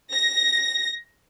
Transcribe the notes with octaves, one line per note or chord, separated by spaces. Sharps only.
A#6